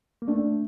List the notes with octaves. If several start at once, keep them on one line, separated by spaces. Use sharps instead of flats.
A#3
A3 D4